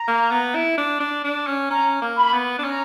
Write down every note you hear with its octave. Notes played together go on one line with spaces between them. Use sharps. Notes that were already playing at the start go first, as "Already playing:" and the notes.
Already playing: A#5
A#3
B3
E4
D4
D4
D4
C#4
C#4 A#5
A#3
B5
B3
D4
C#4 A#5